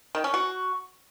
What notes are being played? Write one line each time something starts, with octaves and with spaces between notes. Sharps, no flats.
D#3
C#4
F#4